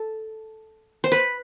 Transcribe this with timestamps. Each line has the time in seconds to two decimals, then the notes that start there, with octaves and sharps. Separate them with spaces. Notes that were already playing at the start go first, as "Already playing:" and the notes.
Already playing: A4
1.04 C5
1.12 B4